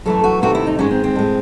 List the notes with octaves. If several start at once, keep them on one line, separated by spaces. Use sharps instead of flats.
F#2 E3 A3 A4
F#4
C3 D#3 A3 F#4
E4
D#4
G#2 D#3 G#3 C#4
C4
C4
A2 G#3